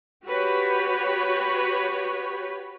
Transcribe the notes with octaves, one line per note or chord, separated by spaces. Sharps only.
F#4 G4 B4 C#5